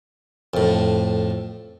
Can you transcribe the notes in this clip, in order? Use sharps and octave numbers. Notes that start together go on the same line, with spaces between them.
F2 A2